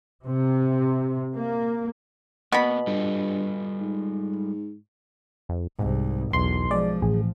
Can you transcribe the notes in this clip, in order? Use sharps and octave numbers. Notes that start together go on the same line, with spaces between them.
C3
A#3
B2 A#3 B3 B5
G2 G3 F4 A4
G#2
F2
C2 G#2
B1 E2 C6
F3 G#3 D5
A1 G#4